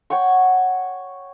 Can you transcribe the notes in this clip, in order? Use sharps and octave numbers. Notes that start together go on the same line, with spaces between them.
C#5 F#5 G5 C#6